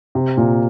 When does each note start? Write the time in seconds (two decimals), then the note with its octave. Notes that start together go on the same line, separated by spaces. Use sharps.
0.15 C3
0.37 A#2